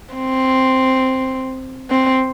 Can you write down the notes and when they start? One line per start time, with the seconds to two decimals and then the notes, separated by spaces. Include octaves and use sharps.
0.14 C4
1.91 C4